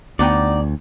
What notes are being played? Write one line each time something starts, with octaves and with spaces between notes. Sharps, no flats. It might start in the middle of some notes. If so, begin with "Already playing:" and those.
D2 B3 D#4 D5 G5